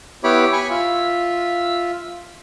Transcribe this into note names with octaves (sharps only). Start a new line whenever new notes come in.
B3 E4 G4 C#5 B5 D6
G#5 B5 C#6
F4 E5